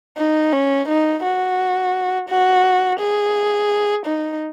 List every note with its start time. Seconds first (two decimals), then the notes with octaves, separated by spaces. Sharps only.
0.18 D#4
0.53 C#4
0.88 D#4
1.24 F#4
2.29 F#4
3.00 G#4
4.06 D#4